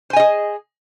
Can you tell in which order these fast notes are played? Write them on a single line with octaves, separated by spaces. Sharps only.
C5 G#5 D#5 G#4